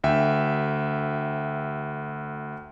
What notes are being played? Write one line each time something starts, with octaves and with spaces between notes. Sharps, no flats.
D2 E5 G5